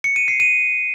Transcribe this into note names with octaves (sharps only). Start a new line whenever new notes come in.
C#7
D#7
C7
D#7